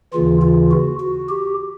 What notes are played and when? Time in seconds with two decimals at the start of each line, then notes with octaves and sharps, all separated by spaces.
0.14 D#2 C#3 E3 F4
0.42 F4
0.71 F#4
1.00 F#4
1.29 G4